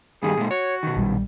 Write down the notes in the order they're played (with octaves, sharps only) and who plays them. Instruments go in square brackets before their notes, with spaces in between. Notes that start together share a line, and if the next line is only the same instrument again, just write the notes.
[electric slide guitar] G2 D#3 G3 [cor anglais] G#4
[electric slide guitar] A#2 G#3
[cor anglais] F#4 [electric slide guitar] C#5
[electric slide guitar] B2 D#3
[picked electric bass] A#1 G3